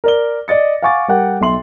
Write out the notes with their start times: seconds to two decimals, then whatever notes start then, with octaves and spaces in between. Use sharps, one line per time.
0.04 A#4 D5 G7
0.48 D5 D#5 A6 C#7
0.82 F5 F#5 G#5 C#6 D6 A6
1.08 G3 A#4 F#5 G5
1.41 B1 E5 C6 F#7